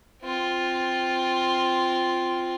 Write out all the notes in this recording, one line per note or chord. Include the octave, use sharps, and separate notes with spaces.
C4 F4